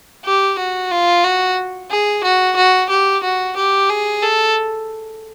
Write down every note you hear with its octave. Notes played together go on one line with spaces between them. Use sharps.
G4
F#4
F4
F#4
G#4
F#4
F#4
G4
F#4
G4
G#4
A4